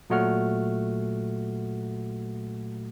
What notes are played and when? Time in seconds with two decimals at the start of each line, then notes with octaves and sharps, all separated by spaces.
0.10 A#2 F#3 A3 F#4 F#5 F6